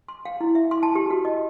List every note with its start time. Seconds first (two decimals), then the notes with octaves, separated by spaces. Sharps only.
0.08 C6
0.25 F5
0.41 E4
0.55 E5
0.71 C6
0.83 A5
0.95 G4
1.10 F#4
1.25 D#5